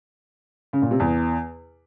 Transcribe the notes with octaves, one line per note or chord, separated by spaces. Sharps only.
C#3
A#2
C3
E2